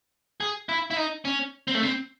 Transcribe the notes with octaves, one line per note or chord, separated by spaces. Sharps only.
G#4
E4
E4
D#4
C#4
C4
A3
C4